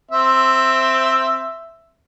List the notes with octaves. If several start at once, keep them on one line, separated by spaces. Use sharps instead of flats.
C4 E5